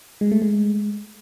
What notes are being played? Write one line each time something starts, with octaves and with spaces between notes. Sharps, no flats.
G#3
A3
G#3